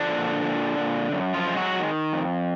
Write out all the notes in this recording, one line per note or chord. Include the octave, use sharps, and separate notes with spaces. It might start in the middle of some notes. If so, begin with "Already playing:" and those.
Already playing: D3 F3 D4
A#2
A#2
A#2
F#2
F3 F4
G#3
F#3 F#4
D#3
F2